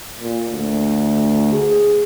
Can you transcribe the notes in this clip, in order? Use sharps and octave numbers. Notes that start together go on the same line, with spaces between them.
A#2
D2
G#4